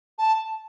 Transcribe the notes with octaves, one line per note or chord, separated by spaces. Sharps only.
A5